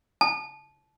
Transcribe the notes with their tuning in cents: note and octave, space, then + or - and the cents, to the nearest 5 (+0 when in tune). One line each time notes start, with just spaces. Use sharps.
A5 -25